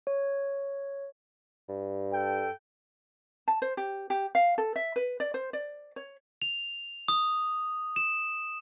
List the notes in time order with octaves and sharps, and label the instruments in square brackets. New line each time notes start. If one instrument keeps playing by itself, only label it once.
[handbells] C#5
[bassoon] G2
[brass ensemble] A4 G5
[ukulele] A5
C5
G4
G4
F5
A4
E5
B4
D5
C5
D5
C#5
[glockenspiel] F7
D#6
E7